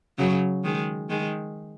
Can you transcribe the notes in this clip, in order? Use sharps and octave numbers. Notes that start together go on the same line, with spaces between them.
C#3 F#3
D#3 G#3
D#3 G#3